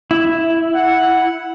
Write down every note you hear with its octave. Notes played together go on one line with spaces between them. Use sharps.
E4
F#5